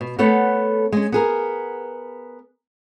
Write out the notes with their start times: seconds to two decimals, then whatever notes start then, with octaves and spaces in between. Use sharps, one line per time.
0.01 B2
0.18 A3 B3 A4 B4 C#5 F#5
0.92 G#3 C#4
1.12 B3 G#4 A#4